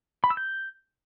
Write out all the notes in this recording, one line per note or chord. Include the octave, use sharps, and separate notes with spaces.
B5
E6
G6